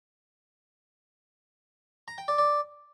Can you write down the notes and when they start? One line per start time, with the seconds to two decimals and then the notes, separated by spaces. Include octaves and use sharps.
2.08 A#5
2.18 G5
2.28 D5
2.38 D5